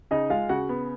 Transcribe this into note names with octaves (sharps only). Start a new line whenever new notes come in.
C#3 D#4 D#5
G#3 F4 F5
C#3 F#4 F#5
B3